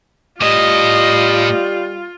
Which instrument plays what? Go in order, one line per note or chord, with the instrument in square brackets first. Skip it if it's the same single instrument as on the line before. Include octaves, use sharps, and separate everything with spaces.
[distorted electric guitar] A2 [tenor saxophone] G3 [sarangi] F4 [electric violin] D#5